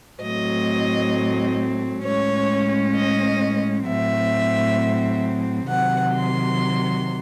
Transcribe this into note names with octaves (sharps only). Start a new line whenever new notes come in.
A2 F#3 A3 C4 D#5
A2 G#3 C#4 C#5
D#5
A2 F#3 C4 E5
C3 D#3 F#3 F#5
C6